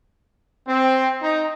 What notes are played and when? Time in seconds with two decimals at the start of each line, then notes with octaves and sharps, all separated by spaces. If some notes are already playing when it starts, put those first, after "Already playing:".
0.67 C4
1.22 D#4